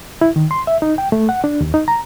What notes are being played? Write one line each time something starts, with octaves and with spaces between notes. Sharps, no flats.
E4
D#3
C6
E5
D#4
G5
A3
F#5
D4
D#2
D#4
A#5